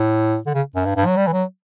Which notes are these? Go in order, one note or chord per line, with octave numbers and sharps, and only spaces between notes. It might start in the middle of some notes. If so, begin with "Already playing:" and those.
Already playing: A2
D3
C#3
F#2
G2
G2
F#3
G3
E3
F#3